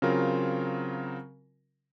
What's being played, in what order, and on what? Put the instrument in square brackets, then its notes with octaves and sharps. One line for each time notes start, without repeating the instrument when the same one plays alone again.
[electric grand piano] C#3 F#3 C4 F4 A#4